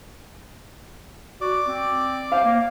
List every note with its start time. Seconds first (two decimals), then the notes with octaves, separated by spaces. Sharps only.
1.41 F#4 D5 D6
1.67 C4
2.32 C5 F5
2.44 A#3